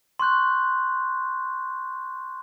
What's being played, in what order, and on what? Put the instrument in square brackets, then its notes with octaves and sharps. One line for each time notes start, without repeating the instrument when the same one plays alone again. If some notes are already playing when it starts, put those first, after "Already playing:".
[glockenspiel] C6 C#6 F#6 G6